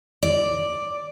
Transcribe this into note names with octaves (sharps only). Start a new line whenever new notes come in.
D5